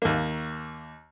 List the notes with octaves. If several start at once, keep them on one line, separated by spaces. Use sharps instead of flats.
D#2 A#3